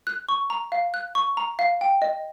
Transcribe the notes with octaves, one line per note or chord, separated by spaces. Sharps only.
F#6
C#6
A#5
F5
F#6
C#6
A#5
F5
G5
D#5